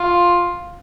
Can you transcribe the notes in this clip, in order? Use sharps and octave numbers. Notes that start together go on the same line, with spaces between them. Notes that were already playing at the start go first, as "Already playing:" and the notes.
Already playing: F4